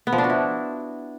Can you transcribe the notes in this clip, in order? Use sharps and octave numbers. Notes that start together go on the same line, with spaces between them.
B3
F3
D4
F#4
E4